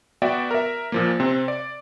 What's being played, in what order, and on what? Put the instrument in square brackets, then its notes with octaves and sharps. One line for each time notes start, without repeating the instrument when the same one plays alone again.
[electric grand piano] B3 F#4 D5 E5 G5
A#4 E5
A#2 F3 A#3
C3 C4
D5